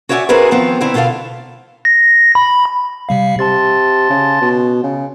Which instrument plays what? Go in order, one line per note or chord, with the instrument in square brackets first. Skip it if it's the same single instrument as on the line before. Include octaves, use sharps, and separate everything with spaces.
[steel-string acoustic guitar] F#4 C#5 D5 E5 G5 G#5
C4 D4 F#4 G#4 A#4 B4
D#3 F3 B3 C4
D3 D#3 B3 C4 E4
B2 D3 F4 A4 F5
[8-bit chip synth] A#6
B5
C3 G3 F5
[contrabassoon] C3 [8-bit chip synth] A5 C6 A6
[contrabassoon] C#3
B2
C#3